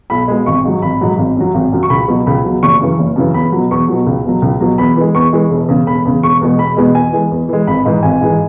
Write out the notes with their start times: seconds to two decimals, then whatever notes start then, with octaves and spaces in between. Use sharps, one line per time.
0.10 B1 B5
0.28 B2 G#3
0.46 G#1 C#6
0.65 G#2 F#3
0.82 G#1 B5
1.01 G#2 F#3
1.18 G#1
1.37 F#2 F#3
1.54 G#1
1.72 F#2 F#3
1.83 C#6
1.90 C#2 B5
2.08 B2 F#3
2.26 C#2 B5
2.44 B2 F#3
2.63 F#1 C#6
2.81 F#2 C#3 E3
2.99 F#1
3.16 F#2 C#3 E3
3.34 E2 B5
3.52 B2 F#3
3.71 E2 C#6
3.88 B2 F#3
4.07 C#2
4.25 B2 F#3
4.42 C#2
4.60 B2 F#3
4.78 E2 B5
4.97 E3 G#3
5.15 E2 C#6
5.33 E3 G#3
5.51 E1
5.68 E2 C#3
5.87 E1 B5
6.05 E2 C#3
6.23 E1 C#6
6.41 E2 B2 G#3
6.58 E1 B5
6.77 E2 B2 G#3
6.95 E2 G#5
7.12 E3 G#3
7.31 E2
7.49 E3 G#3
7.67 G#1 B5
7.85 G#2 E3 G#3
8.03 G#1 G#5
8.21 G#2 E3 G#3